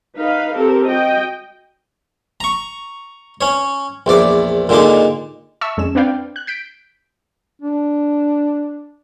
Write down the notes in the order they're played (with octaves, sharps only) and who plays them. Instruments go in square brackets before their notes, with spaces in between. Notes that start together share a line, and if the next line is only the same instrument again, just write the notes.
[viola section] D#4 B4 F5
C4 G4 A4 A#4
F#4 D#5 G5
[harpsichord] A#5 C#6
C#4 C#5
A#1 E2 D5 D6
A#2 D3 G#3 D#4 D6
[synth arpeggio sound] E5 A5 C#6 E6
F2 G#3 C#4 E7
C4 D4 B4 D5 F5 G5
F#6
G6 B6 D7
[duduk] D4